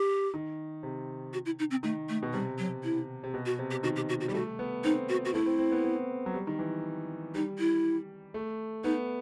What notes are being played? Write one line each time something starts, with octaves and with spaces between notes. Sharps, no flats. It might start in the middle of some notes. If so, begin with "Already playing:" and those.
Already playing: G4
D#3
C3
F#4
E4
D#4
C4
D#3 A3
A3
B2
C3 G3
F#3
E4
C3
B2
F#4
C3
G4
D#3 F#4
G4
F#4
F#4
G3 G4
A3 F#4
B3
C4 D#4
F#4
F#4
A3 E4
C4
C4
B3
B3
F#3
G3
D#3
E3
G3 D#4
E4
A3
B3 D#4